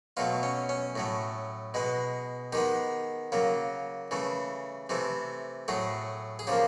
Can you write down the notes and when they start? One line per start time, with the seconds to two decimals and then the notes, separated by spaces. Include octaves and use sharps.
0.17 B2 F#3 A3 F4
0.43 C#4
0.69 C#4
0.96 A2 F#3 A3
1.74 B2 G#3 B3
2.53 D#3 G#3 B3 G4
3.32 C#3 F#3 A#3
4.11 C#3 E3 A3
4.89 C3 E3 A3
5.68 A2 F#3 A3 G#4
6.39 G#4
6.47 C#3 F3 A#3 G4